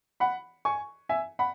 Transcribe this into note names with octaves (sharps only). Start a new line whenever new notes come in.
F#5 B5
G#5 C#6
E5 G#5
F#5 B5